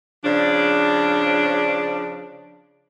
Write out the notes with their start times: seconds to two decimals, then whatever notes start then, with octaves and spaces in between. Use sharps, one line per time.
0.25 C#3 F3 D4